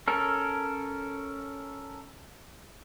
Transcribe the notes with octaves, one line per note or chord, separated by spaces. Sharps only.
C#4 A4 A#4